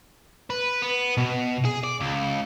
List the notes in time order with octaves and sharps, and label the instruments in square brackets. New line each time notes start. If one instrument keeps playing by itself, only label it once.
[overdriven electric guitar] B4
B3
B2
G#4
D5
C#2